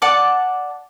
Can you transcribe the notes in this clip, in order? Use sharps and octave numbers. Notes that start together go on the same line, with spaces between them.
D5 F#5 A5 D6